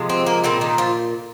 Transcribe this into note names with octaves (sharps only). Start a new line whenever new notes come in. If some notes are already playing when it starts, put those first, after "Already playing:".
Already playing: C3 F3 G#3
C4
A#3
A#2 G3 C4
D#3 D#4
F3 F4